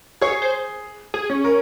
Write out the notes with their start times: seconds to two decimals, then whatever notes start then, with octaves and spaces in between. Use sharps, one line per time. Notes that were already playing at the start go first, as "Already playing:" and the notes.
0.21 G#4 C#5
0.42 C5
1.14 G#4
1.30 C#4
1.44 A#4